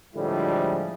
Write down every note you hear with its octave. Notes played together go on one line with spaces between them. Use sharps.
A2 D3 F3 G3 G#3 E4